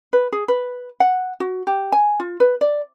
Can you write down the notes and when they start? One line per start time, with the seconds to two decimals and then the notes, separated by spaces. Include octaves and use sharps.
0.13 B4
0.32 G#4
0.48 B4
1.00 F#5
1.40 F#4
1.67 G4
1.92 G#5
2.20 F4
2.40 B4
2.61 D5